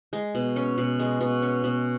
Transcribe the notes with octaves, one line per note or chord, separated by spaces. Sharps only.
G#3
B2
C#4
B2
G#3
B2
C#4
B2